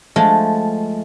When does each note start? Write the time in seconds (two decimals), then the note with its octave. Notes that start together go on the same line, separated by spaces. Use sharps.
0.16 F3 G#3 A3